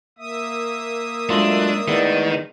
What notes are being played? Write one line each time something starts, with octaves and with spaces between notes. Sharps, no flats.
A#3 E5 D#6
F#3 G#3 A3 D4 F4
A2 D#3 G#3 B3 D5